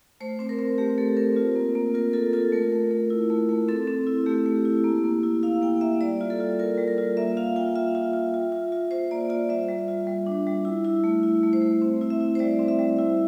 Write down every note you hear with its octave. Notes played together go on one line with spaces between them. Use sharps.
A3 C5
C4 C5
A#4
C4
A3 G4
A3 A4
C4 A#4
F4
A#3
A#3
F4 A#4
F4 A4
F4 A4
A3 A#4
A3
A3
E4
A3
A3
C4 A4
C4
E4
A3 G4
A3
E4
A#3
A#3
E4
E4 F5
A#3 G5
A#3 E5
G3 D5
F4
A4
F4
F4 A#4
G3
A#4
F4
A#3 E5
F4 F5
F4 G5
F4 E5
F4
F4
F4
F4
F4
F4 C5
A#3 D5
F4 D5
G3 E5
G3
F4
G3
D4
G3
E4
E4
A3
E4
A3
C5
A3
C4
E4
E5
E4
C5
G3 D5
C4
E5
G3
E4